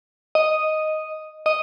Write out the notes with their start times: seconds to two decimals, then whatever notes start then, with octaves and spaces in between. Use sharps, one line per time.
0.35 D#5
1.46 D#5